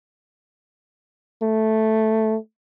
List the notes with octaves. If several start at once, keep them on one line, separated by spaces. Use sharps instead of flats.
A3